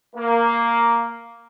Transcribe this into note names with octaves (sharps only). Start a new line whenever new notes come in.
A#3